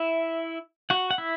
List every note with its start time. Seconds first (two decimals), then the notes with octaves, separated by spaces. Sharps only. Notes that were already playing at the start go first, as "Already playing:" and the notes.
Already playing: E4 E5
0.90 F#4 F#5
1.11 F#5
1.18 E4 E5